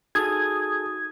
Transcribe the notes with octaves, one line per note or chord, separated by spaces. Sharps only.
D#4 F#4 G#4 A4 D#6 G#6 A6